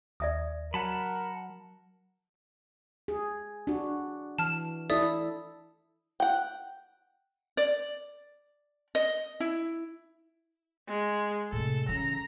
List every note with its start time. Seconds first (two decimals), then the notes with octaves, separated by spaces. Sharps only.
0.20 D#2 D5 E5 D#6
0.74 F#3 A#4 F#5 A5 B5
3.08 G#4
3.67 D4 F#4
4.38 E3 A5 F6
4.90 E4 A4 D5 E5 D#6
6.20 F#5 G5
7.57 D5
8.95 D#5
9.40 E4
10.88 G#3
11.52 A2 C3 A4
11.89 C#3 E3 A#5